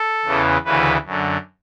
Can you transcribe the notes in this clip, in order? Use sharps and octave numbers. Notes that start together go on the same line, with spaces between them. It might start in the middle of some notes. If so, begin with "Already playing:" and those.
Already playing: A4
E2 C#3 E3
D2 C#3 E3 B4
F#2 D3